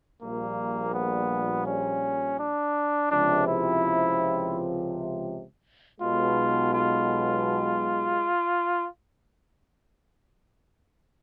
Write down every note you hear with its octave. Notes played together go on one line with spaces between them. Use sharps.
A#1 A#2 G3 A#3
B3
C#4
D4
C#2 C3 F3 D4
E4
B1 B2 G#3 F4
F4